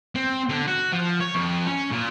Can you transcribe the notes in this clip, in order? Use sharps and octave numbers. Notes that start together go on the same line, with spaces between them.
C4
D3
F#4
F3
C#5
F2
C#4
A#2